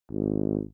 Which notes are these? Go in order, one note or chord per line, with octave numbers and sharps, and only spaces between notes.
G#1